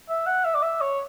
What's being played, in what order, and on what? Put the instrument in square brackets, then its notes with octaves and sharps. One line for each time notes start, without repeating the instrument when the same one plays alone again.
[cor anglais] E5
F#5
E5
D5
E5
C#5